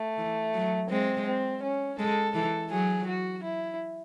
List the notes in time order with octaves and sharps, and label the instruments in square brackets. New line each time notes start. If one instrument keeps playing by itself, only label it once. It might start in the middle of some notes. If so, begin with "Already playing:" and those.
Already playing: [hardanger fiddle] A3
[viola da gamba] E3
F#3
[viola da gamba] G#3 [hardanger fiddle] C4
[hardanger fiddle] C4
C#4
[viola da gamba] G#3 [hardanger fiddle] A4
[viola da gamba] E3 [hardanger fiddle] A4
[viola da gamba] F#3 [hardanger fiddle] G#4
[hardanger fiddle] F#4
E4